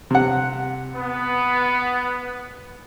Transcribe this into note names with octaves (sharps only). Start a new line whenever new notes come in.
C3 F#5
B3